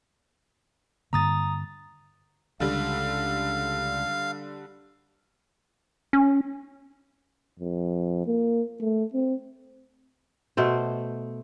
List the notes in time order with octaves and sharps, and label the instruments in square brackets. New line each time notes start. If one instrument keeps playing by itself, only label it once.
[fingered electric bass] G2 D3 A#3 [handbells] A#5 D#6 A6
[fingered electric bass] C#2 [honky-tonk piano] D3 G3 [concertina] F5
[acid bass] C#4
[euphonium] F2
A#3
A3
C4
[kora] B2 A3 C5